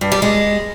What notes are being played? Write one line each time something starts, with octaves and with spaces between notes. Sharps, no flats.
G2
G3
G#3